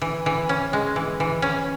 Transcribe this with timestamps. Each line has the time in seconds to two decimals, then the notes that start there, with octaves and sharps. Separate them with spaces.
0.01 E3
0.26 E3
0.49 C#4
0.73 G#3
0.96 E3
1.20 E3
1.42 C#4